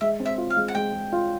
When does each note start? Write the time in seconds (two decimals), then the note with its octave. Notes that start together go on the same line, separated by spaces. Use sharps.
0.01 G#3 E5
0.20 C4
0.26 E5
0.38 F4
0.50 F5
0.57 G#3
0.68 F#5
0.75 G#3 G5
0.93 G#3
1.13 F4